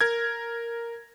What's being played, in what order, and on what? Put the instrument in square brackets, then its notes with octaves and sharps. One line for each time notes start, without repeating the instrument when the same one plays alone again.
[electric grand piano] A#4 G#6